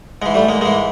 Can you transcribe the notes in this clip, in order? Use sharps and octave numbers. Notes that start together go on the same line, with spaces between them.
G#2 E3 G#3
G3 A3
G#3 A#3
G#2 E3 G#3 A#3